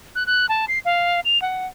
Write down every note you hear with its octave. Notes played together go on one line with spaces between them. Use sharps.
F#6
F#6
A5
C7
F5
F7
F#5